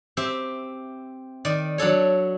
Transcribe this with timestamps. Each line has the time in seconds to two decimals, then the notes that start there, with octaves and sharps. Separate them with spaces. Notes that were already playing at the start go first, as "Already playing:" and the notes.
0.17 C4 G4 E5
1.45 D#3 D5
1.78 F#3 D4 A4 C#5